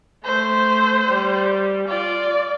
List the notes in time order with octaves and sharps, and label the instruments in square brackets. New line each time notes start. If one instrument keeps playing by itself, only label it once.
[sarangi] A3 [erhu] C5
[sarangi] G3
[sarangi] F4 [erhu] D5